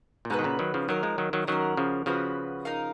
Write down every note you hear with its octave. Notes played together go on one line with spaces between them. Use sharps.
A#2
G#2 B2 D#4 F#4 B4
D#3
A#2 C#3
D#3 F#3
C#3 F3
D#3 F#3 D#4 A#4 F5
F3 G#3
D#3 F#3
D#3 F#3
D#3 F#3 C#4 F#4 A#4
C#3 F3
C#3 F3 C#4 F#4 B4
D#4 A#4 F5